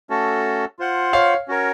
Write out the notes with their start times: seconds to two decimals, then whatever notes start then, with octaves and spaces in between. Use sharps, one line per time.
0.10 A3 C#4 F#4 A4
0.79 F4 C5 F#5
1.13 C#5 F5
1.48 C#4 F#4 A#4 C#5